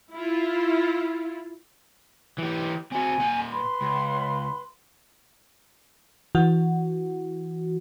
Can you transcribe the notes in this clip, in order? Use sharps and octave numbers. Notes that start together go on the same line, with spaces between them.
E4 F4
E3 G4 G6
C4 F#4 G#5
A#2 F#5
B4 B5 C6
C#2
E3 F#4